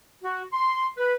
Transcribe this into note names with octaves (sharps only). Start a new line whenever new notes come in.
F#4
C6
B4